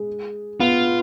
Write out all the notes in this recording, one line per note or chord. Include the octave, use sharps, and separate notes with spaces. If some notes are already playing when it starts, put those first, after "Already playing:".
Already playing: G#3
B3 F4